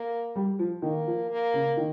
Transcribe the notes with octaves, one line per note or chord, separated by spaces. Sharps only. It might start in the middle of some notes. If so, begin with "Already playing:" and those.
Already playing: A#3
G3
F3
D#3 A#3
F3
A#3
C#3
D#3